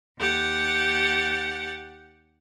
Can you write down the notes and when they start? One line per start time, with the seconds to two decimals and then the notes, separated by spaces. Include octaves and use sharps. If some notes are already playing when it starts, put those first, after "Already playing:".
0.17 D#2 G4 F#5 A6